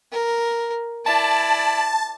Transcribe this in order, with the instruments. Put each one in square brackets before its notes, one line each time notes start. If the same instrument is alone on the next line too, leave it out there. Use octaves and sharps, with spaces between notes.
[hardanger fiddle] A#4
[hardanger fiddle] E4 D5 [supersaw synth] A5